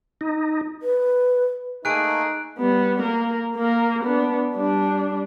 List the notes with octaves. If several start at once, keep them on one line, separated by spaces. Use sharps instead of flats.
D#4
B4
A3 A#3 D#4 G#4 F#6 D7
G3 B3
A#3 A#4
A#3 A#4
B3 D4
G3 D4